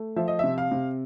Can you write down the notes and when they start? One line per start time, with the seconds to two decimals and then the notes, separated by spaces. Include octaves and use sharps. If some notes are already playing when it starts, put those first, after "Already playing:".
Already playing: A3
0.16 F3 E5
0.28 D#5
0.39 C3 E5
0.58 F5
0.72 C3